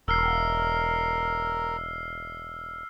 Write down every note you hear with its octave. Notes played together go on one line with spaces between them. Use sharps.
E1 A#4 E6 F6 C7